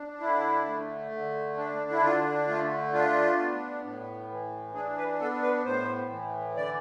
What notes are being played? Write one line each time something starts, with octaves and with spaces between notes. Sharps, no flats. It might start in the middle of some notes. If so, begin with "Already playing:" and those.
Already playing: D4
D3 E4
A3
D3
D4
E4
D3 F4
A3 F4
D4 F4
B3
A2
E3
D4 G#4
B4
B3 A4
B4
A2 C5
E3
D3 D5